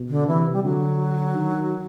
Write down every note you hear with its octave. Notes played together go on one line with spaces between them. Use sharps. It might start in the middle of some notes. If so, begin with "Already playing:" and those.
Already playing: B2
D3
C3 E3
G3
D3 F#3
D#3